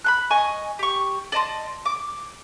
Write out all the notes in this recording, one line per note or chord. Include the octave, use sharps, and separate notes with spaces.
B5 C6 F#6
D#5 G#5 C#6
G4 C#6
D5 D#5 A5 C6
D6